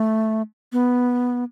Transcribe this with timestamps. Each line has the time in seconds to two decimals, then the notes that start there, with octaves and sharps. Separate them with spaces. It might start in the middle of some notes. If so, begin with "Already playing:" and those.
Already playing: A3
0.73 B3